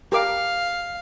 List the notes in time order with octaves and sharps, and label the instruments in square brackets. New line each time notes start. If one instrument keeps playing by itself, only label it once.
[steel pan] G4 A#4 D6 [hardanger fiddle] F5